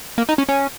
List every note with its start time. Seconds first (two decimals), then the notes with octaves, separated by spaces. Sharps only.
0.18 A#3
0.29 D#4
0.38 C#4
0.49 C#4